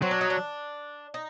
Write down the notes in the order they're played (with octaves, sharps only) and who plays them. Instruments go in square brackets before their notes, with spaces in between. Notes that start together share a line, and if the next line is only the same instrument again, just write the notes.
[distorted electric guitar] F#3 [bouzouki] C4
[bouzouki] D4
D#4
D4
D#4